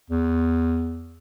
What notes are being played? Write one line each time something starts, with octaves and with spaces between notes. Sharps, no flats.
E2